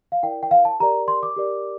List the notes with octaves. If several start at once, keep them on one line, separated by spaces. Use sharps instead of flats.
F5
E4 A#4 D5 G5
G5
F5
A5
G4 A#4 D5 A#5
C6
D6
G4 A#4 D5